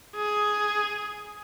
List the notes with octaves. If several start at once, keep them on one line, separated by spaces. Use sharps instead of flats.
G#4